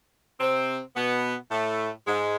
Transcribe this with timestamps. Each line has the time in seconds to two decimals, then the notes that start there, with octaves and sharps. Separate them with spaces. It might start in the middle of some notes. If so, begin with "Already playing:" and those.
0.40 C3 C4
0.96 B2 B3
1.51 A2 A3
2.07 G#2 G#3